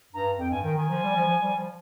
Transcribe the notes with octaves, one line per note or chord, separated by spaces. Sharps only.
G2 A#5
F2 G5
G2 G#5
D#3 G5
D#3 G#5
F3
G3
F3
F3
G3
F3